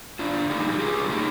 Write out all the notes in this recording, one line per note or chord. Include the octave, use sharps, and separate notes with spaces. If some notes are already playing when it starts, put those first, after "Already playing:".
D3 D4 F4
D3
D#4 G4
G3
G4
G3 F4 G#4
D3
D#4 G4